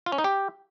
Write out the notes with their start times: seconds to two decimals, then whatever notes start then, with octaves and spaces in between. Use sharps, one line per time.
0.06 F4
0.12 C#4
0.18 D#4
0.24 G4